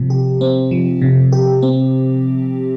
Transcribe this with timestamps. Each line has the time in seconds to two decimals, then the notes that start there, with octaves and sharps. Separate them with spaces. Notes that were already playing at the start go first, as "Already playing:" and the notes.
Already playing: C3 F3
0.10 G4
0.41 C4
0.71 F3
1.02 C3
1.32 G4
1.63 C4